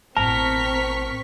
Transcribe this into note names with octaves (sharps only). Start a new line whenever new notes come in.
A1 B2 C4 A#4 A5 C#6 B6